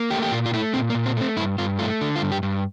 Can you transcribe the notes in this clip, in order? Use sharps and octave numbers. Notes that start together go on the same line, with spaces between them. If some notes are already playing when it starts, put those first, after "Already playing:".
Already playing: A#3
A3 G4
G4
A#2 F4
F4
A3 E4
A#2 C4
A#3
A#2
C4
A3 C4
G2 E4
G2 F4
A3 F4
D3
F4
G2
G4
G2